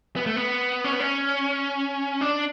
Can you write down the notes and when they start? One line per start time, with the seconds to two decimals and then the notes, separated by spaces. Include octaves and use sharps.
0.16 B3
0.26 A3
0.36 B3
0.84 C#4
0.93 B3
1.00 C#4
2.21 D4